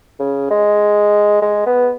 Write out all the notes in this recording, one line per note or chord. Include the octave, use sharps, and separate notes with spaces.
C#3
G#3
G#3
B3